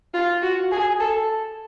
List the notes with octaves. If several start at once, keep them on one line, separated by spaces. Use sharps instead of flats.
F4
F#4
G#4
A4